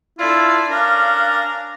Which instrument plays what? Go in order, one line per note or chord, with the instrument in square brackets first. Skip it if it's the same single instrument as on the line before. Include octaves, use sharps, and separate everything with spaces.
[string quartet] D4 A4 D5 [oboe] E4 [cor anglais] F4
[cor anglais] C#4 [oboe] D4 [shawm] A#4 [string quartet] F5